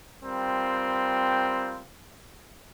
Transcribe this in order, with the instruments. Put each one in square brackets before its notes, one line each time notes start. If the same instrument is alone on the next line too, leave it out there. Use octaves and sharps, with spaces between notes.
[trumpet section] G3 C4 F4 A#4 G5